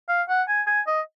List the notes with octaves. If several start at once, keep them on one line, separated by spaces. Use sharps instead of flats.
F5
F#5
G#5
G#5
D#5